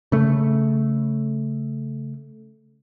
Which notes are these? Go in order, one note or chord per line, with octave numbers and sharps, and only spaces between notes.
C#3 A3